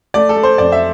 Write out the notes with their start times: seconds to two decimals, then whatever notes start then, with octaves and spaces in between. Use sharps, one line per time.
0.14 A3 D5
0.29 A4
0.37 A3
0.43 C5
0.58 F2 D5
0.72 E5